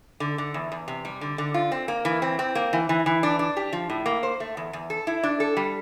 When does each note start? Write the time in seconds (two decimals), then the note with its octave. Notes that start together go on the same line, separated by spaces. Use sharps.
0.20 D3
0.38 D3
0.54 E2
0.72 E2
0.88 C3
1.05 G3
1.21 D3
1.38 D3
1.54 F4
1.72 C4
1.88 A#3
2.05 E3
2.22 C4
2.39 C4
2.55 A#3
2.73 E3
2.89 E3
3.06 E3
3.23 D4
3.39 D4
3.57 G4
3.73 F3
3.90 A2
4.06 A#3
4.23 C5
4.40 A3
4.57 E2
4.73 E2
4.90 A4
5.07 E4
5.23 D4
5.40 A4
5.57 G3